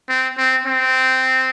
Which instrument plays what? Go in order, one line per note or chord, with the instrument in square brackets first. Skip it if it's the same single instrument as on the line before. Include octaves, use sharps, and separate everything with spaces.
[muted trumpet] C4
C4
C4